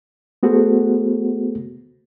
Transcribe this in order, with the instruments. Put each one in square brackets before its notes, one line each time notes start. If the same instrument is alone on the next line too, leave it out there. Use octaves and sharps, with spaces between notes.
[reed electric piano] A3 B3 F#4 G#4 A4 C5